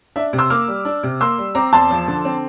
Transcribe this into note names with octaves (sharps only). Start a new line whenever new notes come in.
D4 E5
C3
C6 E6
A#3 D6 F6
G3
D4
C3
A#3 C6 E6
G3
C4 A#5 D6
E2 A5 C6
F3
D3
C4